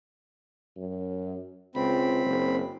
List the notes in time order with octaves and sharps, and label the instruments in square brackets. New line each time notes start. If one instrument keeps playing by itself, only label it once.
[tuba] F#2
[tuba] C#2 [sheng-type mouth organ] C4 B5
[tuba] F#1